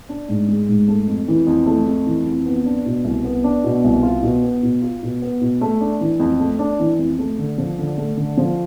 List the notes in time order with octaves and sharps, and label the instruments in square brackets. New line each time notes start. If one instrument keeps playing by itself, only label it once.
[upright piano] D4
G#2
G#3
G#2
A3
F2
E3
F2
A3
F2
E3
F2
B3
D4
B2
C2
B3
D4
B2
C2
F4
B2
B3
B2
F4
B2
B3
B2
A3
D4
E3
F2
A3
D4
E3
F2
A3
D3
F3
D3
A3
D3
F3